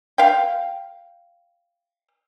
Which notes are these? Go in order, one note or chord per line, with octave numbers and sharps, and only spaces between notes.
F5 G5